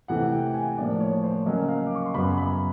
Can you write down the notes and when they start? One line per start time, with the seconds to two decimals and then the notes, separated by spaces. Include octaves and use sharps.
0.08 C3 E3 A3 F#5
0.32 G5
0.54 G#5
0.78 A2 F3 A#3 D4 D5
1.00 C#5
1.24 C5
1.46 C#3 F#3 A#3 C#4 D#5
1.69 F5
1.86 D6
1.95 C#6
2.06 C6
2.14 F#2 C#3 F#3 B3 B5
2.38 B5